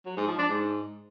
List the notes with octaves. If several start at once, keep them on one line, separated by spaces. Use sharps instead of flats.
F#3
G#2
F3
D4
G#2